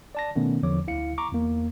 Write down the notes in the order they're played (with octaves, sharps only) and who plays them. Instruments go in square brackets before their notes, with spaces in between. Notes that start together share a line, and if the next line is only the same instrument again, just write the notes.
[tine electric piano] D5 A5 A#6
B2 D#3 A3 B3 C#4
E2 D3 F3 C#5 D6
D2 E4 F5 C#7
A#5 C#6 D6
E2 A#3